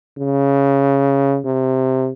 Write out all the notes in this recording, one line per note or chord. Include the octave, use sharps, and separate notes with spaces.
C#3
C3